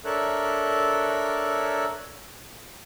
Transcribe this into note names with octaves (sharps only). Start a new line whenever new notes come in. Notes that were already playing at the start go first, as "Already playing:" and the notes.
D4 A4 A#4 C#5 E5 F#6